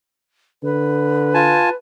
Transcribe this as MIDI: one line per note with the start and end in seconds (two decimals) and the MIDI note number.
0.64 1.62 50
0.64 1.76 71
1.34 1.69 65
1.34 1.69 80
1.34 1.69 81